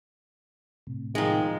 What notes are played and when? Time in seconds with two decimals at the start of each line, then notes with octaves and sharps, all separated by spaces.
0.87 A2 C3
1.15 D#3 F3 G#3